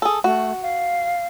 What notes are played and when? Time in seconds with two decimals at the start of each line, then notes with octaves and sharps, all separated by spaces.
0.02 G#4 A4
0.24 A3 F#4
0.62 F5